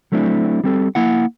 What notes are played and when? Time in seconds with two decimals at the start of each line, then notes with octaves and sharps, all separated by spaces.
0.12 F#3 A3 C4 D4 E4
0.64 G3 C4 A4
0.95 A#3 E4 F#5